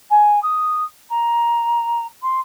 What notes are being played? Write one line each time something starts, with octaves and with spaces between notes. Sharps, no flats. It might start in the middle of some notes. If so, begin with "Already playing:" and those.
G#5
D#6
A#5
C6